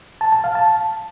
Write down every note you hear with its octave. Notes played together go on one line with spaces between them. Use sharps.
A5
A5
F5
A5